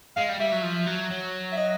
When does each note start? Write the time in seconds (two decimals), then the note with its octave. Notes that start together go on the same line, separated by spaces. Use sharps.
0.16 G#3 F5
0.29 G3
0.40 G3 E5
0.52 F#3
0.63 F3
0.87 F#3
1.11 F#3
1.52 E5
1.57 D#5